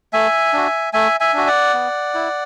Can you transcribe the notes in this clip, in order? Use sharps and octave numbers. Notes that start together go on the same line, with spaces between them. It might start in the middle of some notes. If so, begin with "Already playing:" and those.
A3 E5 G#5
D4 F#4
A3 E5 G#5
E5 G#5
D4 F#4
D5 F#5
B3
E4